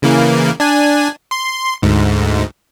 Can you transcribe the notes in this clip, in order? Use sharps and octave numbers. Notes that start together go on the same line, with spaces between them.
C#3 E3 A#3
D4 G#5
C6
D2 G#2